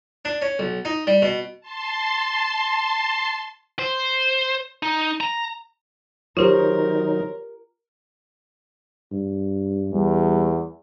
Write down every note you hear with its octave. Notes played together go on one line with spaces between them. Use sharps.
D4
C#4
B1
D#4
G3
B2
A5 C6
C5
D#4
A#5
D#3 F#3 D#4 F4 G4 A#4 C5 C#5
G2
E2 G3